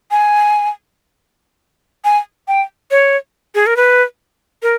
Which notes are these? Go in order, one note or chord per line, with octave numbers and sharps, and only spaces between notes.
G#5
G#5
G5
C#5
G#4
A#4
B4
A#4